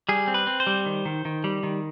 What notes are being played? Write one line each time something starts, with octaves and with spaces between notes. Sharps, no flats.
G3 G#4
C4
B4
C4
C5
G3
D#3
D#3
D#3
G3
D#3